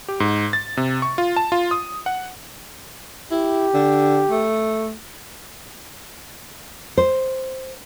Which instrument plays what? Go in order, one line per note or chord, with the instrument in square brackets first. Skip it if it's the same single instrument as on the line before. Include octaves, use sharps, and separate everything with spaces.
[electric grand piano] G4
G#2
A6
C3
C#6
F4
A5
F4
D#6
F#5
[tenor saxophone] E4 [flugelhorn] G4
[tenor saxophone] D3
A3
[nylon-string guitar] C5